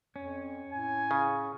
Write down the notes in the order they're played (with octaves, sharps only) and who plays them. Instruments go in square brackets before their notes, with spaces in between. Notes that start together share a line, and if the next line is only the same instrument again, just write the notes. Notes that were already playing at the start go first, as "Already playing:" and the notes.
[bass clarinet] F2 [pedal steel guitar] C#4
[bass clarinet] A2 [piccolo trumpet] G#5
[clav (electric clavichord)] C#3